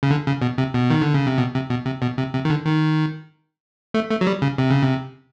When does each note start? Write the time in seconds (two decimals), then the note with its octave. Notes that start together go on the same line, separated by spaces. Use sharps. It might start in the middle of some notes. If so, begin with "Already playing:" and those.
0.03 C#3
0.10 D3
0.27 C#3
0.42 B2
0.58 C3
0.74 B2
0.90 D#3
1.02 D3
1.14 C#3
1.27 C3
1.38 B2
1.54 C3
1.70 B2
1.86 C3
2.02 B2
2.18 C3
2.33 C3
2.45 D#3
2.50 D3
2.66 D#3
3.94 A3
4.10 A3
4.21 F#3
4.27 G3
4.42 C#3
4.58 C3
4.71 C#3
4.82 C3